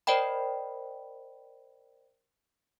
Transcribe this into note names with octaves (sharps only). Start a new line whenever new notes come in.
A#4 C5 D5 D#5 G5 B5